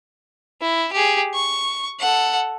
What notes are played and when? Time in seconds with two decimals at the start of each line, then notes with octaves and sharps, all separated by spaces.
0.61 E4
0.92 G4 G#4
1.34 C#6
2.00 A4 F#5